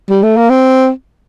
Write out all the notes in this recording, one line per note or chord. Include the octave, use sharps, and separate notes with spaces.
G3
A3
A#3
C4